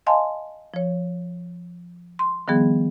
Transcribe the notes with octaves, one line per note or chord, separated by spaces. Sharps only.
D#5 F5 G#5 A5 C6
F3 C#5
C6
D#3 F3 G3 B3 G#4